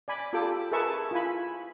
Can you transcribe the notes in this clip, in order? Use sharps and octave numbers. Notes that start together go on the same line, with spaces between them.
D5 G#5 B5
F4 G4 A4 G5 D6
G#4 A#4 B4 E5 A5 C#6
E4 F4 G#5 B5